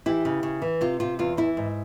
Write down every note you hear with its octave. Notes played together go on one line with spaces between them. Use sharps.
E3 E4 G4
C#3
C#3
E3
C3 F4
C3 F4
E2 F4
E3 E4
G#2